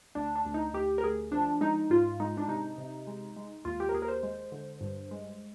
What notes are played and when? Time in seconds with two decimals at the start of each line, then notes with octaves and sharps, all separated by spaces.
0.15 D2 D4
0.36 D4
0.45 D2
0.54 D#4
0.73 D2 G4
0.98 A#4
1.04 D2 G#4
1.32 F3 D4
1.61 G#3 D#4
1.90 G#2 F4
2.20 G#3 D#4
2.37 D4
2.48 C3 D#4
2.78 C3
3.07 G#3
3.36 G#3
3.65 D#2 F4
3.80 G4
3.89 A#4
3.94 D#2 G#4
4.02 A#4
4.08 C5
4.23 G#3
4.52 D3
4.81 G2
5.11 G#3